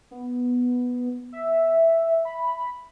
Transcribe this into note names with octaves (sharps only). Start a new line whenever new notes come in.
B3
E5
B5